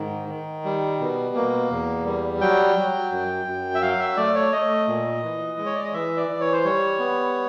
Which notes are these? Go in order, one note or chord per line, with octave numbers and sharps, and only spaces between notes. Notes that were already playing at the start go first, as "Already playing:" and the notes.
Already playing: G#2 D#3
D#3
G3
B2
A#3
E2
G3
F#3 G5
F#3
F#2
F#2
E5
F#3 F5
E5
A3 D5
C#5
A3 D#5
A#2
E3
G#3
C#5
D5
D#5
E3 E5
D5
E3
C#5
C5
G3 C#5
B3